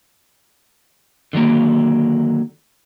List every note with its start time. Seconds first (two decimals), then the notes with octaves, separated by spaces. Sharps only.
1.33 D3 D#3 F#3 A#3